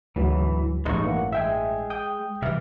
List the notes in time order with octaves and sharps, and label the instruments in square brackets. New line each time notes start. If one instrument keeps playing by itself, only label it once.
[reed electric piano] D2 F#3 [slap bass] G#2 [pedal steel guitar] E3
[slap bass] A1 G2 [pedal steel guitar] G#3 D#4 C#6
[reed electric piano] E3 A#3 [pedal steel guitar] F#5
[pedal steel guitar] G#3 [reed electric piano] E5 G5 G#5
[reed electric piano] G5 D#6 G6
[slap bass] C3 E3 [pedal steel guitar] G3 E5 F6